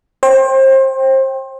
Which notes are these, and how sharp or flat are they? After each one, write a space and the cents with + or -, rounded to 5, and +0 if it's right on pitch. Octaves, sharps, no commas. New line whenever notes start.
C5 +30 G5 +0